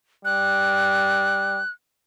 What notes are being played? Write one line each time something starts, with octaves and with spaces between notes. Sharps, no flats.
G3 F#6